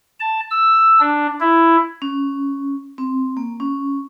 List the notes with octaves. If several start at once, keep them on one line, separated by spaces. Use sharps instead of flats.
A5
E6
D4
E4
C#4
C4
A#3
C#4